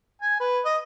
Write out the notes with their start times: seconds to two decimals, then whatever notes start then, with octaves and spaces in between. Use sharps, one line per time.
0.22 G#5
0.40 B4
0.65 D#5